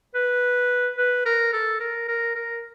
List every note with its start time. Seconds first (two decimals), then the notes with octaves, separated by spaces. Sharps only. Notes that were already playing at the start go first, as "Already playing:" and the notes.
0.15 B4
0.98 B4
1.25 A#4
1.53 A4
1.80 A#4
2.08 A#4
2.35 A#4